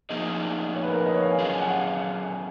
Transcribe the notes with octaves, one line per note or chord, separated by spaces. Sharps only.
F3 A#3 D#4 G#4 D#5
C#5
B4
A#4
B4
D#5
C#5
F5
G#5
F#3 C#4 F4 G#4
G#5
F#5
F5